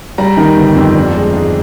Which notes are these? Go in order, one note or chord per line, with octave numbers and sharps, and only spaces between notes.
G3 A#5
D#3
G1
F2
D4
G#3
G#2